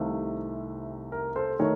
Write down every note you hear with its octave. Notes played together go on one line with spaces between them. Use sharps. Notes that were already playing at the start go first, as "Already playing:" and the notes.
Already playing: C2 C3 D#3 A3 F5
A#4
A4 C5
D#3 A3 A#4 C#5